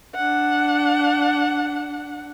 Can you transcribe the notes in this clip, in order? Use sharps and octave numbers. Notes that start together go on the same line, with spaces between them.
D4 F#5